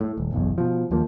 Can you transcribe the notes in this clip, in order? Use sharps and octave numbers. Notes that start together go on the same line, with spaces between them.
A2
D#1
F#1 B1 E2
B2 F3
D#2 F3 A#3